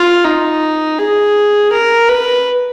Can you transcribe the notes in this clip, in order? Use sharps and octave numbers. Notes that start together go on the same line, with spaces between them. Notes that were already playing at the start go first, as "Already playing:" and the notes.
Already playing: F4
D#4
G#4
A#4
B4